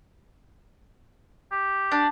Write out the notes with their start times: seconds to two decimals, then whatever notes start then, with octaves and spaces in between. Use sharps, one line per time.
1.52 G4
1.92 D4